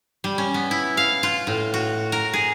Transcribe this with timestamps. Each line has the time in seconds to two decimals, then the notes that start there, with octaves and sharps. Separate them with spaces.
0.24 G3
0.38 C#4
0.54 B3
0.71 E4
0.97 F5
1.23 F4
1.47 A2
1.74 F#4
2.12 A#4
2.33 G#4